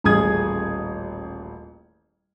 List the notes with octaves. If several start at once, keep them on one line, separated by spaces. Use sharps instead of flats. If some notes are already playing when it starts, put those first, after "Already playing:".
D#1 A1 G#4 D#6 G#6